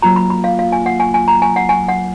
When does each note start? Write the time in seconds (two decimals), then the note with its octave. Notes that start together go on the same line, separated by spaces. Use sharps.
0.02 F#3 A#3 F4 A#5
0.16 B5
0.30 B5
0.44 F5
0.59 F5
0.72 G#5
0.86 F#5
1.00 G#5
1.14 G#5
1.28 A#5
1.42 G#5
1.56 F#5
1.69 G#5
1.88 F#5